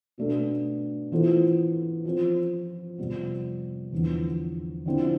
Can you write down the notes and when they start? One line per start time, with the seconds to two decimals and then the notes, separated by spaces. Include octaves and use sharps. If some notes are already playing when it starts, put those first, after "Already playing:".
0.18 B2 A3 D4 A4
1.12 E3 B3 F4 A4 C5
2.05 F3 C4 F4 C5
2.98 F2 C3 G3 B3
3.92 E2 D3 F3 B3
4.86 D3 F3 C4 E4